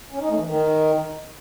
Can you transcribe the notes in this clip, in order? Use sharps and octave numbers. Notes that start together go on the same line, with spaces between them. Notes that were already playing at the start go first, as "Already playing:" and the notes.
C#4
D#4
A3
E3
D#3